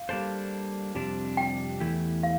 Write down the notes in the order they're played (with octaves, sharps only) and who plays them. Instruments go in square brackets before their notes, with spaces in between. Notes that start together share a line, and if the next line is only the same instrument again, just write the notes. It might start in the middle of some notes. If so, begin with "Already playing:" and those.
Already playing: [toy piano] F5
[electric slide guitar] G3 A#3 D4 A4 C5
F2 C3 G3 D4
[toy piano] G5
[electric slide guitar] E2 E3 A3 E4 G4
[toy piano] F5